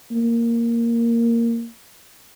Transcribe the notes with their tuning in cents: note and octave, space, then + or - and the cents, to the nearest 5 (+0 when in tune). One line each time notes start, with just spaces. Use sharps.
A#3 -5